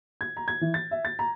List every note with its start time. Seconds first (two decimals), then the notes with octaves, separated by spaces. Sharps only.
0.21 G#6
0.37 A#5
0.48 G#6
0.61 E3
0.74 A6
0.91 E5
1.05 A6
1.19 A#5